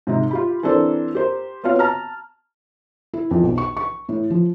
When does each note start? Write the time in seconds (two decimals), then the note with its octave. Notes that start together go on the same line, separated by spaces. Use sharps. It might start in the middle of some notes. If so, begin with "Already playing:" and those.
0.07 G#2 C3 D#4
0.31 F4 G4 B5
0.63 E3 C4 D4 A4 A#4 C5
1.15 G4 A#4 C5
1.64 B3 C4 F4 F#4 C#5 F5
1.79 A5 A#5 F6
3.13 E4
3.31 F2
3.43 B1
3.58 C#6
3.77 C#6
4.09 A2
4.30 F3